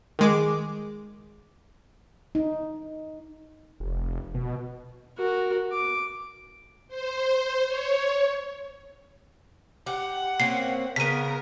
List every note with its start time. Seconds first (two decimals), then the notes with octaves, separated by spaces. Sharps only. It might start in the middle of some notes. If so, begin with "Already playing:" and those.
0.19 D#3 G#3 D6
2.35 D#4
3.80 F1
4.34 B2
5.18 F#4 A#4
5.72 D6
6.88 C5
7.67 C#5
9.87 G4 F#5
10.40 A#3 C4 C#4 C7
10.96 C#3 B3 A#4 B6 D#7